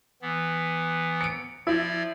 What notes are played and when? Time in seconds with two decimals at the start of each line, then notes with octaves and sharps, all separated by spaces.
0.22 E3 B3
1.21 C#7 D7
1.67 F3 E4 D5 G#6